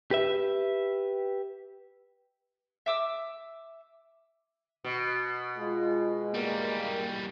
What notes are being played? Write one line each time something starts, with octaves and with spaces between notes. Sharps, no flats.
G4 B4 E5
E5 D6 E6
B2
G#3 F4
E2 G3 A#3